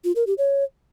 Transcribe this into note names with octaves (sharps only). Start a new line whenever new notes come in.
F4
A#4
G4
C#5